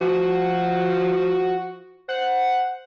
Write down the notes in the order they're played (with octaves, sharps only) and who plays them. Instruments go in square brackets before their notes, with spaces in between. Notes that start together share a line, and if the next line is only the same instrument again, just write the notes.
[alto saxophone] F3 [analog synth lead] F#4
[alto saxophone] C5 [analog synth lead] F#5